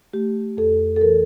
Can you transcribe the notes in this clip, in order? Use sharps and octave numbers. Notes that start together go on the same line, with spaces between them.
A3 G4
F2 A4
A4
E3 A#4